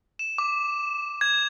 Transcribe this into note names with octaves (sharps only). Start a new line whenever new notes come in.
E7
D6
G#6